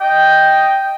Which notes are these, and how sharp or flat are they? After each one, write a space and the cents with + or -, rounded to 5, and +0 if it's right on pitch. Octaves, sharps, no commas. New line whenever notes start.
D#5 +0 G5 +0